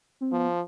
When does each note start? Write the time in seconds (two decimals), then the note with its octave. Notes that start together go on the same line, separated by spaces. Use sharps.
0.21 C4
0.32 F3 B3